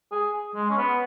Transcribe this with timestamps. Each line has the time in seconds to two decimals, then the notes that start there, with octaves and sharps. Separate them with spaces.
0.11 G#4
0.55 G#3
0.70 C#4
0.77 B3